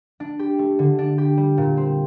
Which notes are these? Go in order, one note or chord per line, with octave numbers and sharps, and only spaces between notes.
D4
G4
A3
D3
D4
G4
G3
A#2
C4